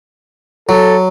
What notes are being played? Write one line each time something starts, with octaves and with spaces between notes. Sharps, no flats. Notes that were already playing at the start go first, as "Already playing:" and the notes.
F#3 A4